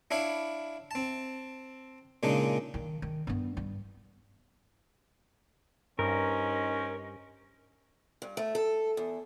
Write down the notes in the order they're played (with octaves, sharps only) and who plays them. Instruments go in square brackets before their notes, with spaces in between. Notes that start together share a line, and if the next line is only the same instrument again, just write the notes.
[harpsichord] D4 E4 C#5 F5 B5
C4 A5
A#2 C#3 G#3 D4 D#4
[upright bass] D#3
D#3
G2 B3
G2
[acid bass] G2 [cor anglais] C#4 [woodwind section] D#4 C5 D#5 [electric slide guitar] A#4
[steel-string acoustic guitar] G2
A3
A4
E2